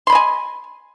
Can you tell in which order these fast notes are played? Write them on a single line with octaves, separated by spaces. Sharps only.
C6 B5 D#5 G#5